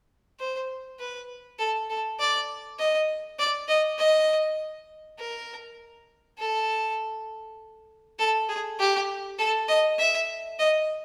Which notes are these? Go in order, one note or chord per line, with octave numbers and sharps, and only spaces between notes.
C5
B4
A4
A4
D5
D#5
D5
D#5
D#5
A#4
A4
A4
G#4
G4
A4
D#5
E5
D#5